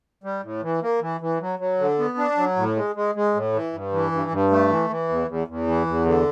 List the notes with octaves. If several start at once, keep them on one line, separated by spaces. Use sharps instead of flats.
G3
A2
E3
A#3
E3
E3
F#3
F#3
D3
B3
D4
F#3
A2
G#3
G#3
G#3
A2
E3
G2
E3
G2
G2
A3
E3
E3
E2
E2
E2
E3
E2
D3